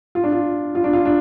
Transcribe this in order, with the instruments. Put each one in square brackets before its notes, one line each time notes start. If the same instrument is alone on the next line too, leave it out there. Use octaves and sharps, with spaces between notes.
[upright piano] F4
D4
F4
F4
D4
F4
D4